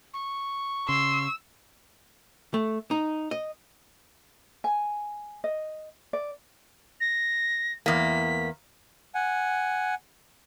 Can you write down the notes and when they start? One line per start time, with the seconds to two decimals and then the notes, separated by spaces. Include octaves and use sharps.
0.14 C#6
0.89 C#3 C6 E6
2.54 A3
2.91 D#4
3.31 D#5
4.64 G#5
5.44 D#5
6.13 D5
7.00 A#6
7.86 E2 A#3 B6
9.15 F#5 G#5